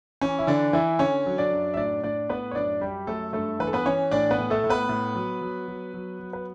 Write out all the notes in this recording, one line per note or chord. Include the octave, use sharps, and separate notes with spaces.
E3 C#4
E4
D3 E3 D4
E3 E4
D3 C#4 C#5
F#3
D4 D5
F#2
E5
A2 D4 D5
A2 D4 D5
A2 B3 B4
C#5
F#2 D4 D5
F#2 G3 G4
F#2 A3 A4
G2 A3 A4
E3 B4
A4
B3 B4
E3 C#4 C#5
A2 D4 D5
B3 B4
A2
A3 A4
A2
B3 B4
A2
F#3
F#3
F#3
F#3
F#3
B4